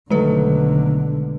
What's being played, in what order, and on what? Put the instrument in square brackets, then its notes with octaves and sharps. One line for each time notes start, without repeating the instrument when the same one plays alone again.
[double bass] B1 D3 [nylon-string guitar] D#3 F#3 A3 [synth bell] G#3 B4